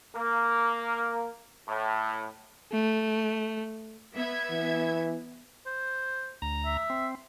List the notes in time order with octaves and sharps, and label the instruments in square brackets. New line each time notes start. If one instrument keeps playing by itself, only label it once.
[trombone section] A#3
A2
[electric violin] A3
[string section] B3 E5 G#6
[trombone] E3
[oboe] C5
[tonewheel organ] D2 A#5
[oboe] E5
[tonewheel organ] C4